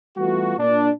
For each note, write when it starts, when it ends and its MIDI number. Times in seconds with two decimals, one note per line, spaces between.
0.17 0.54 52
0.17 0.54 55
0.17 0.54 57
0.17 0.54 59
0.17 0.54 65
0.17 0.54 66
0.58 0.89 46
0.58 0.89 62